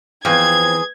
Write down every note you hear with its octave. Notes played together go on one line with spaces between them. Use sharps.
F2 E3 B3 C4 G#4 G#6